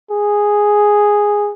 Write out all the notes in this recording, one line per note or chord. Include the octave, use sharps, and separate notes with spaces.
G#4